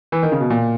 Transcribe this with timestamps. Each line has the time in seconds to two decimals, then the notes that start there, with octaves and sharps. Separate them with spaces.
0.12 E3
0.23 D#3
0.32 C#3
0.40 B2
0.50 A#2